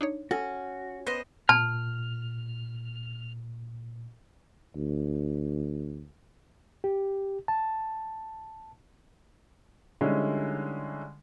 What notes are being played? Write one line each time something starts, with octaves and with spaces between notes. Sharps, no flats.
D4 D#4 C#5
C#4 F#4 A4
B3 B4 C5 D#5 C6
A#2 A5 F6
D2
G4
A5
D3 G3 G#3 C#4 D#4 E4